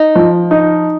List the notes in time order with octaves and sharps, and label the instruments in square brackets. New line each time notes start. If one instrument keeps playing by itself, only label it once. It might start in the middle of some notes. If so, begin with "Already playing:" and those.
Already playing: [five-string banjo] D#4
[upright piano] F3
D#4